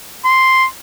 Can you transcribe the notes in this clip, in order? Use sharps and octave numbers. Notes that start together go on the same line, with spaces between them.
C6